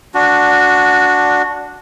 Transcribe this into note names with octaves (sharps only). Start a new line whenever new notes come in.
D4 F#4